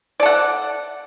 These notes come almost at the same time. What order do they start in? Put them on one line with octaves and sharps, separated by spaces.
D5 A4 F#5